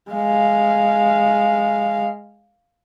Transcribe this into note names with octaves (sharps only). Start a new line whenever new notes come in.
G#3 F5